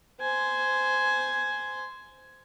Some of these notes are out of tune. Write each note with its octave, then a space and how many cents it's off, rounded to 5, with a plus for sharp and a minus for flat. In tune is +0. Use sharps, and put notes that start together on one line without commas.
C5 -10 G#5 +5